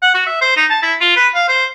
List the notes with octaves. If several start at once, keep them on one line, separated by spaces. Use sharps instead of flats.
F#5
F#4
E5
C5
D#4
A5
E4
F4
B4
F5
C5